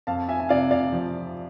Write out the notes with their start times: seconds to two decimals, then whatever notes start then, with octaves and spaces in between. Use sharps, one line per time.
0.07 F2 F5 A5
0.29 E5 G#5
0.40 G#5
0.49 C3 D5 F5
0.71 D5 F5
0.92 F3